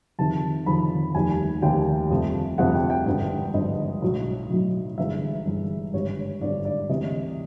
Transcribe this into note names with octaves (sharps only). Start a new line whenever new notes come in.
F2 C3 D#3 A5
F2 C3 D#3 B5
F1 D#2 D#3 G3 G#5
F1 D#2 D#3 G3 G5
G1 F2 C3 F3 A3
G1 F2 C3 F3 A3 F#5
G5
G5
G#1 G2 D3
G#1 G2 D3 D#5
B1 A2 F#3
B1 A2 F#3
G1 G2 E3 G#3 E5
G1 G2 E3 G#3
G#1 G2 D3 G3 C#5
G#1 G2 D3 G3 D5
D5
D2 C3 E3 A3 D#5